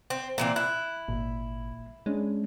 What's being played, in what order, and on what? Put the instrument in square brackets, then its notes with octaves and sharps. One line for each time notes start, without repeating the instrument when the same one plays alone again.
[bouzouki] C4
A#2 E3 C4
[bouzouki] E4 [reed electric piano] F#6
[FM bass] G#1 [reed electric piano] A#2
[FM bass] G#3 [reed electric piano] C#4 D4